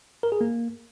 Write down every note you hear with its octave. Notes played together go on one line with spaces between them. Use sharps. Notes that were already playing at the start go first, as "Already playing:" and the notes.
A#4
G#4
A#3